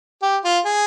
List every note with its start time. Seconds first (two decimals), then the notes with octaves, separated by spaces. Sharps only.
0.22 G4
0.45 F4
0.66 G#4